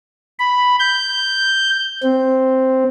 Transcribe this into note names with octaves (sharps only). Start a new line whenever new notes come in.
B5
G6
C4